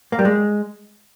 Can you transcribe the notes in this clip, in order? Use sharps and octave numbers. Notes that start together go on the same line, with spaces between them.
A#3
G3
G#3